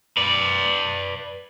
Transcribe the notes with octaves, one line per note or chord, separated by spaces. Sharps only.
B4 D5